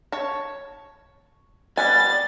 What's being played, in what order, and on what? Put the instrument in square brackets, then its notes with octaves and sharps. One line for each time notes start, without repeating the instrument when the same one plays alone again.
[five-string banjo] C#5 A5
[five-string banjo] G3 B3 G#5 [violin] A6